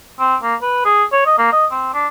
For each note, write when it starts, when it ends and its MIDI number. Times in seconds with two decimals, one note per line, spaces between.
0.19 0.36 60
0.43 0.55 58
0.62 0.82 71
0.85 1.04 68
1.12 1.26 73
1.26 1.33 75
1.38 1.51 58
1.52 1.66 75
1.71 1.91 60
1.94 2.07 62